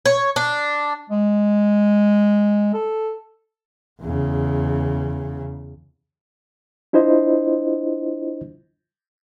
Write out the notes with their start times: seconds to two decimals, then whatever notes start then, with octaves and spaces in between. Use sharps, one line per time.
0.06 C#5
0.36 D4
1.10 G#3
2.74 A4
4.01 E2 C#3
6.93 D4 E4 F4 C5 D#5